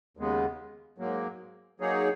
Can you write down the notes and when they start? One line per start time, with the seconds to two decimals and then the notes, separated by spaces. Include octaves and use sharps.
0.17 D#2 C#3 G#3 B3
0.98 G#2 F#3 A#3
1.80 F#3 A#3 D#4 G#4 C#5